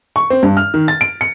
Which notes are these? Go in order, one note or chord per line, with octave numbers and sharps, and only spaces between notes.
C#6
C4
G2
F6
D#3
A6
D7
C#7